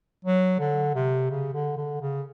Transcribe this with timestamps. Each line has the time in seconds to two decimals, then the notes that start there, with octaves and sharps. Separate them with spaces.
0.25 F#3
0.59 D3
0.95 C3
1.31 C#3
1.54 D3
1.77 D3
2.02 C#3